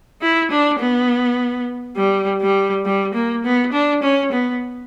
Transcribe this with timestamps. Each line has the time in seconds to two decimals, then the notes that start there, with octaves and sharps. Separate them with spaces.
0.22 E4
0.51 D4
0.80 B3
1.97 G3
2.41 G3
2.85 G3
3.14 A#3
3.44 B3
3.72 D4
4.03 C#4
4.32 B3